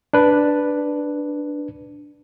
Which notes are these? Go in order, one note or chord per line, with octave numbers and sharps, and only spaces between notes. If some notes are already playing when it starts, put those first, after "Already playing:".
D4 B4